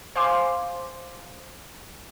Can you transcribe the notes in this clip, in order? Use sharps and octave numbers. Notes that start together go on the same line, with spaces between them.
C5 F5 G#5 C6 D6